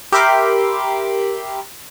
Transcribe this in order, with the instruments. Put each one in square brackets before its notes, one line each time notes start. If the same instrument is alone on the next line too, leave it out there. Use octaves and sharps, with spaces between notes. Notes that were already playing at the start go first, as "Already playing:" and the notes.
[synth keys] G4 A#4 E5 B5 C6 D6